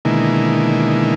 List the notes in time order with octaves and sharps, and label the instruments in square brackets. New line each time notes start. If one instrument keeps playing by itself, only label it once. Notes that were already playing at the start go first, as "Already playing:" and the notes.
[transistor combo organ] B2 D3 D#3 G#3 A#3 E4